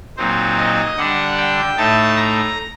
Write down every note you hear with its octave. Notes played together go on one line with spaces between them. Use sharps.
A#2 F#3 C4 D#4 C5
D#5
D3 G3 D4 F#5
G5
A2 A3 D#4 A5
A#5